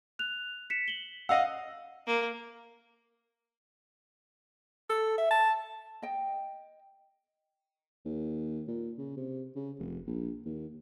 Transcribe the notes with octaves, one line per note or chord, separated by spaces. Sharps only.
F#6 F7
B6 C#7 E7
F#7 G7
D#5 F5 F#5 E6
A#3
A4
E5
A5
D#5 G5
D#2
A#2
C#3
C3
C#3
F1
A#1
D#2